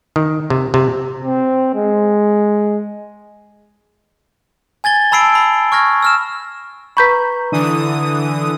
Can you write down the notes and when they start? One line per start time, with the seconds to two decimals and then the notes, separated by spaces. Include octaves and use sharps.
0.16 D#3
0.50 C3
0.74 C3
1.24 C4
1.75 G#3
4.84 G#5 G#6 A6 G7
5.12 A5 B5 E6 C7 D7
5.35 B5
5.72 C#6 F6 G#6 A#6
6.03 E6 F6 E7
6.97 B4 A#5 B5 C#6 G6 B6
7.52 D3 E3 D#6